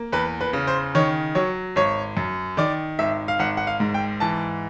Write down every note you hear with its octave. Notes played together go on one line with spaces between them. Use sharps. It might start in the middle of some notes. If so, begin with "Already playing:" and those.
Already playing: A#3
E2 B4
B4
C#3
C5
D#3 C#5
F#3 C#5
G#1 C#5
F#2
D#3 D5
G#1 E5
F5
G#1 F#5
F#5
F5
G#2
G5
E3 A5